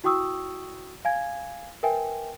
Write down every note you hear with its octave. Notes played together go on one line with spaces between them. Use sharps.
E4 F#4 G5 C#6 D#6 E6
F5 G#5 G#6
A#4 B4 E5 G5 G#5